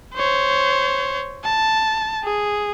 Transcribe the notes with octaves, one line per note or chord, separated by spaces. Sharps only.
C5 C#5
A5
G#4